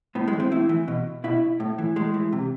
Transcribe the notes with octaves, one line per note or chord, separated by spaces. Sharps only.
A2 B3
G#3
E3
C4
A2 E4
E3
B2
B2 E4
A2
E3
A2 G#3
E3
C3